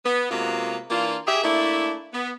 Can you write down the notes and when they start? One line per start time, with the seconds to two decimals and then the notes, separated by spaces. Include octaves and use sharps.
0.05 B3
0.31 C3 G#3 A#3 B3 F4 F#4
0.91 E3 A#3 D4 F4
1.27 G4 G#4 E5
1.44 A3 A#3 D4 E4
2.13 B3